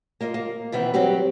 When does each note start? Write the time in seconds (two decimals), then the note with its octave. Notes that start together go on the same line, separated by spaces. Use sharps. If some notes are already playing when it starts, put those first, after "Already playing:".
0.21 A#3 F4 D#5
0.34 A#3
0.72 B2 D#3 E3 B3 C4
0.94 F#3 G3 C4 F#4 G4